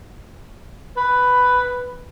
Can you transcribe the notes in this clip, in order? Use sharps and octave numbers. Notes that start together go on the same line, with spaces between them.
B4